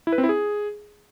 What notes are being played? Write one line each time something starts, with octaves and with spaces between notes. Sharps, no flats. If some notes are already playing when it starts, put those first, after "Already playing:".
E4
B4
C4
E4
G#4